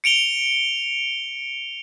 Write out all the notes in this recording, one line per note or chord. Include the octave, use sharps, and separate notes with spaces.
C#7 D7 F7 G7